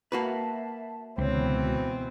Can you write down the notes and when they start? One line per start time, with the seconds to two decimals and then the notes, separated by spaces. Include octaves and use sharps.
0.12 A#3 F#4 B4 E5 A5
1.18 C#2 B2 D3 E3 C4 C5 C#5 G5
1.61 F#4